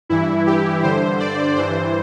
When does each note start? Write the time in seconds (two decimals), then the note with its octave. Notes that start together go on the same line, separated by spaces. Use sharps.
0.09 G2 E3 E4
0.47 G4
0.83 G2 D3 C5
1.20 D5
1.56 G2 E3 C5